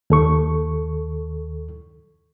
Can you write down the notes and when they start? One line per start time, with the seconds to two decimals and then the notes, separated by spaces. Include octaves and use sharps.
0.10 D#2 A4 C#6